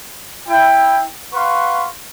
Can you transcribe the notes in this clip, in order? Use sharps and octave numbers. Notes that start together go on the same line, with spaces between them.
E4 G5
B4 F5 F#5 C6 C#6